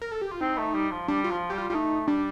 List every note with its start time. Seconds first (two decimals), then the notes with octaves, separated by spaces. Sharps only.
0.01 A#4
0.12 A4
0.21 G4
0.31 F4
0.41 C4 D#4
0.58 A3
0.74 G3
0.91 F3
1.08 G3 D4
1.24 F4
1.30 F3
1.50 G3 G4
1.58 F4
1.70 G3 F4
1.74 A3 D#4
2.08 G3 D4